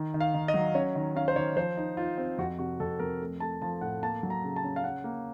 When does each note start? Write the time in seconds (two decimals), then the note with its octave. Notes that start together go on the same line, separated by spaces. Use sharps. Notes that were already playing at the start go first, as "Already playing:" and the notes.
Already playing: D#3
0.14 D#3
0.20 F5
0.34 D#3
0.48 D#5
0.54 F#3
0.74 C#4 C#5
0.95 D#3
1.16 C#4 F5
1.28 C5
1.36 D#3 C#5
1.57 F3 C5
1.77 D#4
1.97 D#4 F4
2.18 C4
2.38 F2 F#4
2.59 C3 F#4
2.80 F2 A4
3.00 F2 A#4
3.21 A3
3.40 A3 A5
3.62 F3 A5
3.81 A2 F#5
4.02 A#3 A5
4.23 F#3
4.30 A#5
4.44 C#3
4.56 A5
4.64 C#4
4.76 F5
4.84 C#4 F#5
5.04 A#3